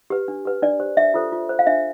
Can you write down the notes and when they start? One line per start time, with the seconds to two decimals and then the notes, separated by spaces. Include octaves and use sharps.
0.10 G4 B4
0.28 D4
0.45 G4 B4
0.62 D4 D5
0.80 G4 C5
0.97 D4 E5
1.14 F4 A4 C5
1.32 F4
1.49 C5
1.59 F5
1.67 D4 E5